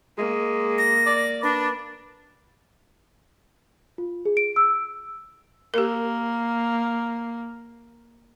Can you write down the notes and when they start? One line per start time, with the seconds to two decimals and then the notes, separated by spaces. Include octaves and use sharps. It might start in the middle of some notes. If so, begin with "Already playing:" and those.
0.18 G#3 A#3
0.78 A#6
1.07 D5
1.43 D4 B4
3.98 F4
4.25 G#4
4.37 D7
4.56 E6
5.74 A#3 G4 A#4